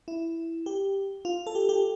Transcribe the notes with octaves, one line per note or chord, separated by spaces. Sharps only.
E4
G4
F4
A4
G4
G4